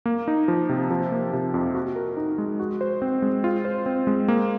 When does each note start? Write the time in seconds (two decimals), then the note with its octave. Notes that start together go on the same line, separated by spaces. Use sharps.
0.06 A#3
0.28 D#4
0.48 F3
0.69 C3
0.91 F3
1.12 A#3
1.33 C3
1.54 F2
1.74 F#4
1.96 A#4
2.17 D#4
2.38 G#3
2.60 F#4
2.81 C5
3.02 C4
3.22 G#3
3.44 F4
3.65 C5
3.86 C4
4.07 G#3
4.28 A#3